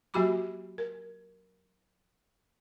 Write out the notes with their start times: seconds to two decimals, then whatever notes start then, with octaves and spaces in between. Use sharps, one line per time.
0.14 F#3 A#3 F#4 G4 B5 D6
0.78 A#4